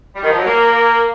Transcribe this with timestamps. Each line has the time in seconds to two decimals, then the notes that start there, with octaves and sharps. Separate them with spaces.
0.15 G3
0.23 D#3
0.30 F3
0.38 F#3
0.46 A#3